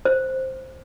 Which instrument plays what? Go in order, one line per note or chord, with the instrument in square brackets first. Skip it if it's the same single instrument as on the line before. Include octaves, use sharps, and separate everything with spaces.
[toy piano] C5